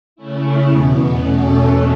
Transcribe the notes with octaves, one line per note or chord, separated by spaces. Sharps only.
C#3 A3 C#4 E4
E2 B2 B3
E2 B2 A3 C#4 A4